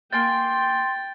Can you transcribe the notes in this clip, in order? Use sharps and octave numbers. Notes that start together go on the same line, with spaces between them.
A#3 G5 G#5 C6 G6 A6